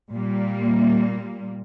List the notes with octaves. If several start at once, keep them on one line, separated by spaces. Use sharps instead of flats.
A#2 G3 A#3